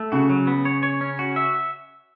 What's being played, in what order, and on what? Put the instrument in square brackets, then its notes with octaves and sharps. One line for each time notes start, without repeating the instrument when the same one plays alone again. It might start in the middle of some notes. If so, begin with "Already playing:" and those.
Already playing: [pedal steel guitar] A3
[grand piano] C#3 [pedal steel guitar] F#4
[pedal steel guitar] F#3
B3
C#5
C#5
C#4
F#4
E5